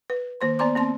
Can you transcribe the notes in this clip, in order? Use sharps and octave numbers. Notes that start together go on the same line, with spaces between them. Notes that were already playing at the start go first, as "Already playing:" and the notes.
B4
D#3 A#3 C5 C6
B3 C5 D5 A#5 C6 D6
A#3 C4 A5 C6